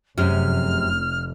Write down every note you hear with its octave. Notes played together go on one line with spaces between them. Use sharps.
F1 F#2 C3 G#3 F6